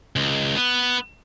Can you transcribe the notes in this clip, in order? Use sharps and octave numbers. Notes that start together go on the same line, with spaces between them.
C#2
B3